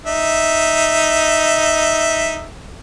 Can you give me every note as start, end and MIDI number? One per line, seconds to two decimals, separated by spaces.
0.06 2.48 63
0.06 2.48 76